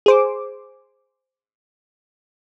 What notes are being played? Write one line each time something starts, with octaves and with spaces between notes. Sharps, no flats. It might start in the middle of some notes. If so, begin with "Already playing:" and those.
G#4 C5 D6